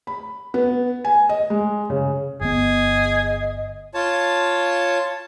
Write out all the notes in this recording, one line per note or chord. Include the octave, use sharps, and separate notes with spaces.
B5
B3
G#5
D#5
G#3
C#3
G1 B3 G#4 D#5
F4 C#5 A5